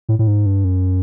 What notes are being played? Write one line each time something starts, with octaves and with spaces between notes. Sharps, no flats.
A2
A2
G#2
G2
F#2